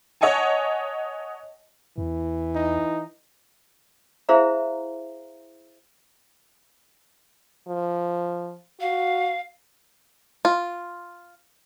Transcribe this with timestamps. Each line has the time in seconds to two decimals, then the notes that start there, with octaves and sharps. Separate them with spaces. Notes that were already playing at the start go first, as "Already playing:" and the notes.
0.21 C#5 D#5 F#5 G#5 A5
1.98 E2 E3
2.55 D#4
4.29 E4 G#4 C5 E5 F5 A#5
7.68 F3
8.80 F#4 F5
10.45 F4